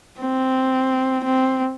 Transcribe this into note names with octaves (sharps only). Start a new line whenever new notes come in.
C4
C4